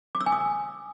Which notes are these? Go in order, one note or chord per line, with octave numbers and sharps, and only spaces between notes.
D6
E6
G#5
D#6